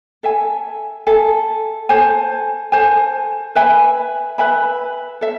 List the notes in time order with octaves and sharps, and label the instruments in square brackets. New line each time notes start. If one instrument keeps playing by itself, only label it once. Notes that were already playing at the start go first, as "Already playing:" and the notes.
[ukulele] A4 E5 G#5
A4 E5 G#5
A4 C5 G#5
A4 C5 G#5
B4 E5 G#5 B5
B4 E5 G#5 B5
A4 E5